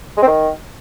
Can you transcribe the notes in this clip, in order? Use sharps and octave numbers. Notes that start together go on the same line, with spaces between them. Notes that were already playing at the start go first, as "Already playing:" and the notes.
G#3
C4
D#3